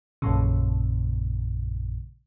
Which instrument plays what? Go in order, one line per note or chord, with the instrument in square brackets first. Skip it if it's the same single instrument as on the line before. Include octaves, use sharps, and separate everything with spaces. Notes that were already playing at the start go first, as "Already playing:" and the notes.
[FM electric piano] A#1 F#2 A#2 C#3